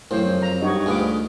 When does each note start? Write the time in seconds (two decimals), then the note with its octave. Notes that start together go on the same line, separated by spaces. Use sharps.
0.11 F#2 A2 C#3 C5
0.25 F2
0.42 A#5
0.61 G2 D#4 F#4 C#5
0.86 D2 G#2 F4 G#4 B4 D6